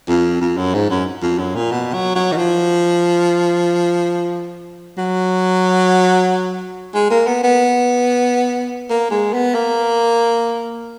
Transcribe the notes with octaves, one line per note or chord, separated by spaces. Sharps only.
F2
F2
F#2
G#2
F#2
F2
F#2
A#2
B2
F#3
F#3
D#3
F3
F#3
G#3
A#3
B3
B3
A#3
G#3
B3
A#3